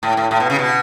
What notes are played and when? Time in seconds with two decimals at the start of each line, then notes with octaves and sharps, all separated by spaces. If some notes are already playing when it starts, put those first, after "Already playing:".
0.03 A2
0.17 A2
0.31 A2
0.40 B2
0.50 C#3
0.59 B2